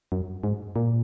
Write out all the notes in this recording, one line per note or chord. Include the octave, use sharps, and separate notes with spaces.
F#2
G#2
A#2